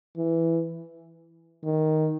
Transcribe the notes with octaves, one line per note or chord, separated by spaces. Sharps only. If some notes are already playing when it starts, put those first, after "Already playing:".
E3
D#3